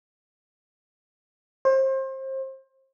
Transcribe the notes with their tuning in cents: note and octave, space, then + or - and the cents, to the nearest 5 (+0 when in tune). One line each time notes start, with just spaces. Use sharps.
C5 +30